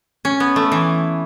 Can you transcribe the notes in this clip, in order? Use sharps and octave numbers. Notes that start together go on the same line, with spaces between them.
C#4
B3
A3
E3